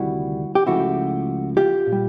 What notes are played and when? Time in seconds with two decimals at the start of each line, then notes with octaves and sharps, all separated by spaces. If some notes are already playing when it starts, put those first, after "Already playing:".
Already playing: D2 C3 D#3 G3 E4 F#4
0.55 G4
0.67 C#2 C#3 F3 A3 E4 F#4
1.57 F4 G4
1.87 A#2
1.92 G3